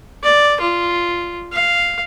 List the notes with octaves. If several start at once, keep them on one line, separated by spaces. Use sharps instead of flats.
D5
F4
F5